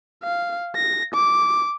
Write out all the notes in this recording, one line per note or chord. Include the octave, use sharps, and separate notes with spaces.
F5
A#6
D6